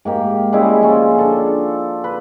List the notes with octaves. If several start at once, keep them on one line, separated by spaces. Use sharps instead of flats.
G#2 A#3 G4
G3 G#3 C#4 E4
F3 C#4 F4
D4 A4 D#5
B4